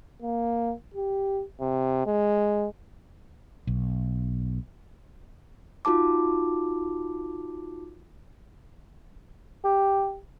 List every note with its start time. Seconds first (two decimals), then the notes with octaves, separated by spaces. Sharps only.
0.22 A#3
0.94 G4
1.61 C3
2.06 G#3
3.67 B1
5.85 D#4 F4 F#4 A5 D6
9.64 G4